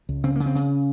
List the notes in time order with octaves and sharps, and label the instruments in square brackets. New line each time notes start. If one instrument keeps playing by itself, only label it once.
[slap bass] C#2
C#3 C4
C#3 A#3
C4
C#3